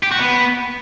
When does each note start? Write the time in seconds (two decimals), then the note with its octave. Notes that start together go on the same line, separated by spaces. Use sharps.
0.03 G4
0.11 F#4
0.20 B3